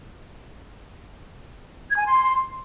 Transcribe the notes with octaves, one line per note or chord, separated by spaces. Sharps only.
G#6
G#5
C6